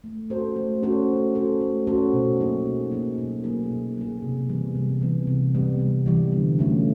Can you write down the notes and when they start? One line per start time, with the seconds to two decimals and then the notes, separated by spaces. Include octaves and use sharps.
0.04 A3
0.30 C#4 F#4 A4 C5
0.56 A3
0.83 C#4 F#4 A4 C5
1.09 A3
1.35 C#4 F#4 A4 C5
1.61 A3
1.87 C#4 F#4 A4 C5
2.13 B2
2.40 F#3 A#3 D#4 G#4
2.66 B2
2.91 F#3 A#3 D#4 G#4
3.18 B2
3.44 F#3 A#3 D#4 G#4
3.71 B2
3.96 F#3 A#3 D#4 G#4
4.22 C3
4.49 E3 G3 B3
4.75 C3
5.01 E3 G3 B3
5.27 C3
5.54 E3 G3 B3
5.80 C3
6.06 E3 G3 B3
6.32 D3
6.59 F#3 A3 C#4 F4